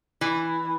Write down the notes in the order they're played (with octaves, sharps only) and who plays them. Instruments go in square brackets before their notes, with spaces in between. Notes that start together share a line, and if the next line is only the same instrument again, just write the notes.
[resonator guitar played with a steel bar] E3